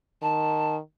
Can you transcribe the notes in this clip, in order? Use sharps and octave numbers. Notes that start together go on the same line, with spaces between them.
D#3 A5